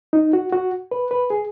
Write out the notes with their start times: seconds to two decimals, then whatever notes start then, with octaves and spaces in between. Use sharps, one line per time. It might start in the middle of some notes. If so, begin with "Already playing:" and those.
0.13 D#4
0.33 F#4
0.53 F#4
0.91 B4
1.11 B4
1.30 G#4